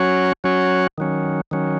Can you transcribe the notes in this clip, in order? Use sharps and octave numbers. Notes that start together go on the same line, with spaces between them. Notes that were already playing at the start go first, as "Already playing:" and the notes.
Already playing: F#3 C#4 F#4 C#5
F#3 C#4 F#4 C#5
D#3 F#3 C#4
D#3 F#3 C#4